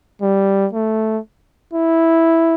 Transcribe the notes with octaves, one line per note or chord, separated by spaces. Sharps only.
G3
A3
E4